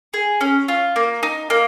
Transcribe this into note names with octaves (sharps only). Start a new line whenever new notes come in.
G#4
C#4
F4
A#3
D#4
A#3